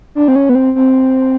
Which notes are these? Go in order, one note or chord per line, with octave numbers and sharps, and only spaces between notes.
D4
C4
C#4
B3
C4
C4